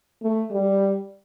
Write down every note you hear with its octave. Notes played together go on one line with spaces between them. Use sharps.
A3
G3